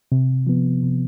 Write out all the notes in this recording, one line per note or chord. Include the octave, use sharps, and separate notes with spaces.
C3
F3 B3
C3